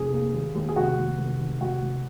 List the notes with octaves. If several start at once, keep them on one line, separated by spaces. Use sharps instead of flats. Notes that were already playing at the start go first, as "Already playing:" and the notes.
Already playing: F1 G#4
A#3
D#2
D#2
G#4
F1 F#4
D#2
F1
D#3
F1 F#4
F1